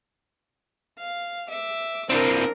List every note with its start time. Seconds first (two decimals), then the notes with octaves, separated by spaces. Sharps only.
0.98 F5
1.49 E5 D6
2.10 E3 C4 D4 A#4